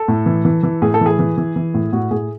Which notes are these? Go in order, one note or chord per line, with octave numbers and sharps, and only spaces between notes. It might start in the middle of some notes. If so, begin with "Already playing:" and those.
Already playing: A4
A2
E3
E3
E3
A2 G#4
A4
E3 G#4
E3
E3
E3
A2
A2 F#4
A2 G#4